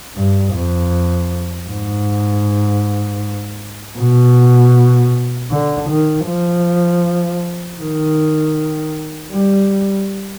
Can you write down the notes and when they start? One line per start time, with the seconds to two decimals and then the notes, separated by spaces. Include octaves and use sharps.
0.16 G2
0.54 F2
1.69 G#2
3.98 B2
5.51 D3
5.89 D#3
6.27 F3
7.80 D#3
9.32 G3